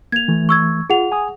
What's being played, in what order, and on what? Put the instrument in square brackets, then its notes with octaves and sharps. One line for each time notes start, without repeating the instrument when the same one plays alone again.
[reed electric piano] A#3 [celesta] G#6 F7
[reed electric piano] E3 A3
[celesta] C#6 E6 G#6
[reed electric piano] F4 [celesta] G#4 F#5 F7
[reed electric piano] G#5 D#6